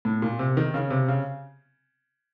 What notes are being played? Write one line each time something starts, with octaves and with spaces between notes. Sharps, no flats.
A2
A#2
C3
D#3
C#3
C3
C#3